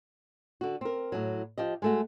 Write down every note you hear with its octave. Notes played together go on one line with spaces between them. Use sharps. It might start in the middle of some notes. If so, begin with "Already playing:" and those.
D3 F#4
C4 A#4
A2 F#3
F3 G4 D#5
G#3 A3 F#4